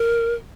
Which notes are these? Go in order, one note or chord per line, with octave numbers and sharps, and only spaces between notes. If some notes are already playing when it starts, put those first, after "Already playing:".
Already playing: A#4